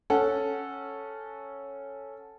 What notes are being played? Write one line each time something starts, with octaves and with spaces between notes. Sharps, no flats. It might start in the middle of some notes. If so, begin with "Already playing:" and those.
C#4 A4 F#5